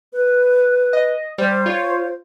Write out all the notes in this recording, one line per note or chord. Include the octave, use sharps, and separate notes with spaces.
B4
D#5
G3 C5
F4 C#5